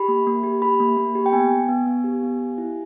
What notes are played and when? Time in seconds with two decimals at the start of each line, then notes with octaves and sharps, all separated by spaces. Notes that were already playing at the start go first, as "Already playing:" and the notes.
Already playing: G4 B5
0.08 A#3
0.27 A#3
0.44 G4
0.62 G4 B5
0.80 A#3
0.97 A#3
1.15 G4
1.26 G5
1.33 B3 G#5
1.51 B3
1.69 B3
1.86 B3
2.04 G4
2.23 B3
2.40 G4
2.58 E4